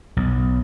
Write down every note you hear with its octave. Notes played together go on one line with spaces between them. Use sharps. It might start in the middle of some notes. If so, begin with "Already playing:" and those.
B1